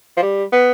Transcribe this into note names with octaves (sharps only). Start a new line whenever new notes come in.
F3
G3
B3